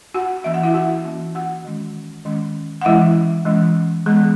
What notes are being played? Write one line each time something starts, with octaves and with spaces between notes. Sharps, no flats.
F#4 F#5
E3 A#3 C#4 E5
F#5
E4 E5
F#4 F#5
E3 A#3 C#4
F#4 F#5
D#3 G#3 C#4
D#3 G#3 C#4
F#5
E3 G#3 C#4 E4 E5
E3 G#3 C#4
E3 G#3 B3 G#4